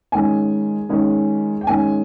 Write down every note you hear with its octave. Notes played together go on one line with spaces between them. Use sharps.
D#3 G#3 C#4 G#5
D#3 G#3 C#4
G5
D#3 G#3 C#4 G#5